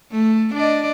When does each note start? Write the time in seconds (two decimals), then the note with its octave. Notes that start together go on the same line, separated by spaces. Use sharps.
0.11 A3
0.54 D4 D5 D#5